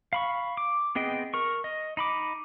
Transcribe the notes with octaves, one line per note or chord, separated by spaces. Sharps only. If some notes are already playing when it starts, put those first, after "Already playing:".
F5 B5 C#6
D6
B3 C4 G#4 D#5 G5
A#4 C#6
D#5
D#4 B5 D6